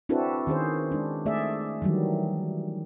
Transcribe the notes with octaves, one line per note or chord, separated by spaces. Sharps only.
C4 D4 E4 F#4 A4 B4
D#3 C#4 G#4 C5
G#3 D4
A3 G#4 D5 E5
D#3 E3 F#3 G3